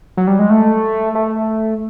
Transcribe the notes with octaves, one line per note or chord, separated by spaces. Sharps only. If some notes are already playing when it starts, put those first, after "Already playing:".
F#3
G3
G#3
A3
A3